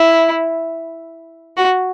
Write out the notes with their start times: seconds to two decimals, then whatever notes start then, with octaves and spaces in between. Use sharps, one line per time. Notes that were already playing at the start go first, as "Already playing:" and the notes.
Already playing: E4
1.57 F#4